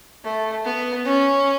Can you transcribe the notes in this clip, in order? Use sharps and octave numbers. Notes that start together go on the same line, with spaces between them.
A3
B3
C#4